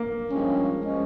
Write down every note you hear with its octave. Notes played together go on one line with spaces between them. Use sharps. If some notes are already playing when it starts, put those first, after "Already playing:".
Already playing: A#3
G2 F3 G#3 C#4
F3 G#3 C#4